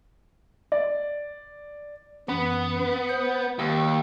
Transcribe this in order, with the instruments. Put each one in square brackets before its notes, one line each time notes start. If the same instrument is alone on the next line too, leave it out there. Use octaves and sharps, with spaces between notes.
[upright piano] D5
[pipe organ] F#2 E3 [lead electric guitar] B3
[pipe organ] C5
[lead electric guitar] D#2 [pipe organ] E6